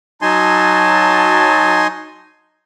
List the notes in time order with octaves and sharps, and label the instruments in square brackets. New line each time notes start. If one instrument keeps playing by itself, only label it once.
[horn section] F#3 A5 [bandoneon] D#4 G#5 C6